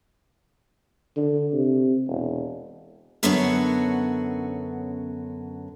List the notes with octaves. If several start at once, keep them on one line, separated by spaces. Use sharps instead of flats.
D3
C3
E1
F#2 D3 B3 C#4 F#4 C#5